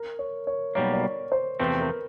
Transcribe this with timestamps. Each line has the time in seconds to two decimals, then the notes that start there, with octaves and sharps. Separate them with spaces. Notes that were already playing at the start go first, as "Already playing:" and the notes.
Already playing: A#4
0.19 C#5
0.47 C#5
0.75 B1 B2 G3 A#3 C#5
0.93 D5
1.03 C#5
1.32 C5
1.60 E2 C3 F3 A3 C4 B4
1.81 A#4